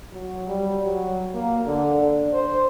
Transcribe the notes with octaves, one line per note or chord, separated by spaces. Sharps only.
F#3
G3
F#3
A#3
D3
D4
C5